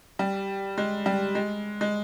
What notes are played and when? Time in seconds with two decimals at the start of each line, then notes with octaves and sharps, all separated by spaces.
0.19 G3
0.78 G#3
1.06 G3
1.35 G#3
1.81 G#3